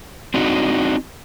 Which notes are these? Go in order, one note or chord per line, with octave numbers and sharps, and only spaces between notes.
C4 D4 D#4 F#4